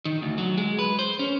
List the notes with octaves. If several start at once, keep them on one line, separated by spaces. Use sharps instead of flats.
D#3
D2
F#3
G#3
B4
C5
C#4